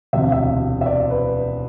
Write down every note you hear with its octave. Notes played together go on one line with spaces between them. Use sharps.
E1 D2 C3 E5
F5
E5
E5
D5
C5
B4